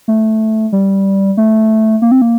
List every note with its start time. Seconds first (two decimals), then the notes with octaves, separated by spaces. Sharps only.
0.08 A3
0.72 G3
1.37 A3
2.02 A#3
2.12 C4
2.22 A#3